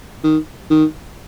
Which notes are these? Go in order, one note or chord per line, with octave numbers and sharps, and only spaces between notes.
D#3
D#3